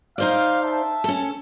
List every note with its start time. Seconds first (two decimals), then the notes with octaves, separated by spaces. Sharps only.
0.18 D#4 C5 D5 F5
0.63 E5 A5
1.04 C#4 A4